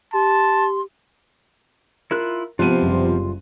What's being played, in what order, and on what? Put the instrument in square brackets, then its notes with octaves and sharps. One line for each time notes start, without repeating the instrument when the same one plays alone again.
[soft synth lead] G4 [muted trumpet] A5 [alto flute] C6
[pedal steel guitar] E4 F4 F#6 [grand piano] A#4
[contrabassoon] C3 [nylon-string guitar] F3 B3 [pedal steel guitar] F4 [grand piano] F#6 D#7
[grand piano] F#1 G3